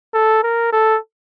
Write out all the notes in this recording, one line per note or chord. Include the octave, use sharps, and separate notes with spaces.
A4
A#4
A4